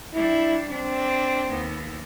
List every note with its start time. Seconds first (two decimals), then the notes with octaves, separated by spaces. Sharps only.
0.13 G3 D4 E4
0.70 C4 D4
1.47 D#2 B3